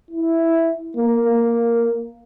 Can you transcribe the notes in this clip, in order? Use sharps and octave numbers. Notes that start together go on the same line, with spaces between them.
E4
A#3
A#3